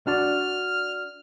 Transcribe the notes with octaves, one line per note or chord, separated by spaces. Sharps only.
D4 F#4 D5 F6